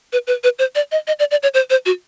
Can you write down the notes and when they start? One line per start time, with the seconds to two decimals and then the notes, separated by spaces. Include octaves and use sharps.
0.13 B4
0.27 B4
0.44 B4
0.59 C5
0.75 D5
0.92 D#5
1.07 D#5
1.19 D5
1.31 D5
1.43 C#5
1.54 C5
1.70 C5
1.86 F#4